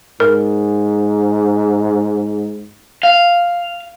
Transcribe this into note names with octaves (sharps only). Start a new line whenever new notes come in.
G#2 A#4
F5